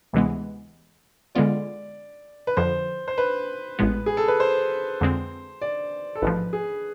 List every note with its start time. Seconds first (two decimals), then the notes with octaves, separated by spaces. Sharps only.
0.13 D2 C3 E3 G#3 B3
1.35 D3 G#3 B3 F4 D5
2.47 B4
2.57 F2 D3 F3 C5
3.08 C5
3.18 B4
3.79 A1 A2 G#3 B3
4.06 G#4
4.17 A4
4.28 B4
4.40 C5
5.01 F2 D3 G#3 C4
5.62 D5
6.15 A4
6.22 A1 G#2 F3 B4
6.53 G#4